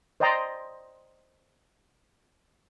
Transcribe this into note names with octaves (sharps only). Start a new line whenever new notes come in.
C5 D5 D#5 G5 A#5 C6